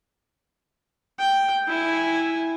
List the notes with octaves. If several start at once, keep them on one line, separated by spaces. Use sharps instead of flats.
G5
E4 G#5